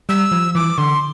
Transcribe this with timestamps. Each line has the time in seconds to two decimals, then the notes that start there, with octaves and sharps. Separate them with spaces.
0.09 G3 E6
0.32 F3
0.55 E3 D6
0.78 D3 C6